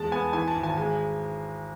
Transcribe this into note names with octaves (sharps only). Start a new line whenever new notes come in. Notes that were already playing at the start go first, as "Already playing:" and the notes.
Already playing: E2 G#3 A5
B3 G#5
E3 G#5
A5
G#1
G#5
A5
G#3 G#5